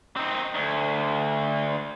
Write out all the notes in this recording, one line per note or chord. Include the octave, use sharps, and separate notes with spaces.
C4 D#4
D2